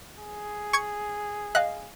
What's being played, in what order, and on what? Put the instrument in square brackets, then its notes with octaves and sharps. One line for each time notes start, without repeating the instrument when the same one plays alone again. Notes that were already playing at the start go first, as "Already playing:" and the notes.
[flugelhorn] G#4
[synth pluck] C#6 G#6 C#7
[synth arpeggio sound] D#5 F5 [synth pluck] F#6